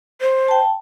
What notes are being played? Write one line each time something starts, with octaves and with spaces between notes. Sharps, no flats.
C5
G5 A5